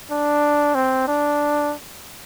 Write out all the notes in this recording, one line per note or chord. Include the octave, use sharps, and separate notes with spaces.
D4
C4
D4